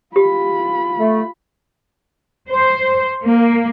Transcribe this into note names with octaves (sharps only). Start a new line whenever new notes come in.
F4 G4 B5
A3
C5
A#3